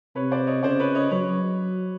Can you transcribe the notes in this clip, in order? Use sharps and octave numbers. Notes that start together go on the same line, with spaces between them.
C3 B4 C#5
C5 D5
C#5 D#5
C#3 C5 D5
B4 C#5
C#5 D#5
F#3 B4 C#5